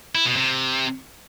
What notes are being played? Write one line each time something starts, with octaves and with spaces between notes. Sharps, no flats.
E4
B2
C3